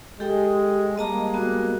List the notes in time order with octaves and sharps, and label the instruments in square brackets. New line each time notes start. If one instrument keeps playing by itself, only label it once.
[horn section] G#3 [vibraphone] G4 A4 G5
[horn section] G3 G#3 A#3 [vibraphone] D#5 A5 A#5
[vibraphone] B3 F#4